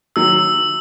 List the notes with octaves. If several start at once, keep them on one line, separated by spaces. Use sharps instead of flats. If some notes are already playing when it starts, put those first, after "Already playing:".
D#3 F#3 E6